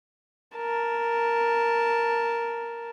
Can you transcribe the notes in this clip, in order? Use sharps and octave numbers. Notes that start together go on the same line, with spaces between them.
A#4 A5